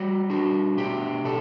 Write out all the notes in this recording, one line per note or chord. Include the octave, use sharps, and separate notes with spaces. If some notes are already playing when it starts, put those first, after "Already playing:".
Already playing: G3 F#4
D4 F#4
B2 G4
B2 A4